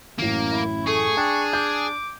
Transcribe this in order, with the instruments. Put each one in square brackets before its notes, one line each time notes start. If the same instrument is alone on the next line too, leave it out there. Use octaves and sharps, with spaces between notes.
[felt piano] A1 F#2 A2 [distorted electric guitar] A#3
[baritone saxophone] E4
[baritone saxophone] A3 [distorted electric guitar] G#4 [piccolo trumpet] C#6
[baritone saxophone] D4 [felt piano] G5
[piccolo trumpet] D6 [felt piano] G6